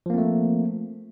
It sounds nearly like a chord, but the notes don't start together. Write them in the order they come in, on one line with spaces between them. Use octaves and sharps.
F3 A#3 C4 A3